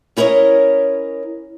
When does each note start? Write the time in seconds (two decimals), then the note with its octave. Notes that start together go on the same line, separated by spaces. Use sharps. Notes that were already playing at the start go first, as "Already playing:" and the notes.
0.17 C#4 E4 A#4 C#5 D#5